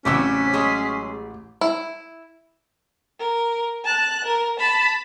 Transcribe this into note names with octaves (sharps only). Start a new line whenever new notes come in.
A1 C#3 F#3 C4 C#4 D6 E6 B6
F#3 G#3 G#4
E4
A#4
A5 F#6
A#4
A5 B5